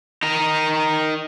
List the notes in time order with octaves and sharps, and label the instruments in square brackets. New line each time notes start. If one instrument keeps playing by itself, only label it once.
[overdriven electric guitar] D#4 A#4